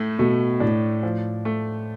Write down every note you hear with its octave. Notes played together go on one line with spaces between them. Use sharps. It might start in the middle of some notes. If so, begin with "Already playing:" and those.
Already playing: A2 A3
B2 A3
A2 D4
F3
A3